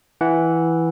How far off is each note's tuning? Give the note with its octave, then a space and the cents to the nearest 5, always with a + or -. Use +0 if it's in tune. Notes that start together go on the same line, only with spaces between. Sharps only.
E3 +0 F#5 +0